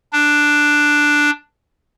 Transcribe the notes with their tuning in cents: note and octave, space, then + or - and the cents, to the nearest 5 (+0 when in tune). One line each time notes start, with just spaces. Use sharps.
D4 +5